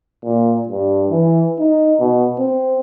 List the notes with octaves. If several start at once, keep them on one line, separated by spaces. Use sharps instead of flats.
A#2
G2
E3
D#4
B2
C4